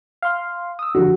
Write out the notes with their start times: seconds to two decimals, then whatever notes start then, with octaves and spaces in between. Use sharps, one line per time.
0.23 F5 C6
0.79 D#6 E6
0.95 F2 D3 F#4